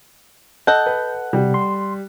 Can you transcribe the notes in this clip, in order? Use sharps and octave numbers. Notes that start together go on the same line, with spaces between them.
A4 D#5 F#5 F#6 G6
B4
C3 G3
C6